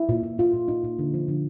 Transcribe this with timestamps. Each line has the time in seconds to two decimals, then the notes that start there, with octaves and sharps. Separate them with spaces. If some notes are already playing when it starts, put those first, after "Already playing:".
Already playing: E4
0.09 A#2
0.24 A#2
0.38 A#2 F4
0.53 A#2
0.68 A#2 D#4
0.84 A#2
0.99 D3
1.14 F3
1.28 D3